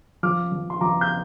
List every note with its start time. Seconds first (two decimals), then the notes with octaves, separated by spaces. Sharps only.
0.23 F3 D6 F6
0.52 F3
0.70 C6
0.81 F3 A#5 D6
1.01 G6